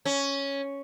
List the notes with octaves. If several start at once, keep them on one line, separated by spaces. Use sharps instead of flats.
C#4